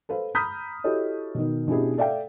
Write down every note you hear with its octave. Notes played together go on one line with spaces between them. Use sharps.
A4 B4 C5 F5
A#5 B5 D#6 F6 G6 B6
E4 F#4 G4 A4 C#5 D#5
B2 D#3
B2 C#4 D4 E4 G4 G#4
A4 D5 E5 F5 G5